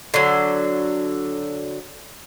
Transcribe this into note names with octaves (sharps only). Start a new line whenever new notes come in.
D3 F#3